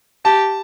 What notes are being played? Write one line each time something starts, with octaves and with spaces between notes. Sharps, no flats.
G4 A5